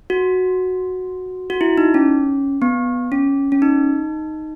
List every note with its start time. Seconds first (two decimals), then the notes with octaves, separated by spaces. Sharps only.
0.10 F#4
1.50 F#4
1.61 E4
1.78 D#4
1.94 C#4
2.62 B3
3.12 C#4
3.52 C#4
3.62 D#4